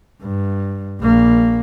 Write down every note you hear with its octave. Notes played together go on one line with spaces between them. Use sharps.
G2
A#1 A#3